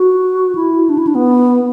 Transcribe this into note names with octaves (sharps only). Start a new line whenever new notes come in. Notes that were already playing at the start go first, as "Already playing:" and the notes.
Already playing: F#4
E4
D4
E4
D4
B3